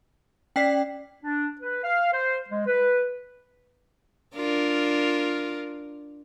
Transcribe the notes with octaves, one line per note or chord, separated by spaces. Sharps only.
C#4 D5 G5 B6 C7
D4
B4
F5
C5
G#3
B4
D4 F4 A#4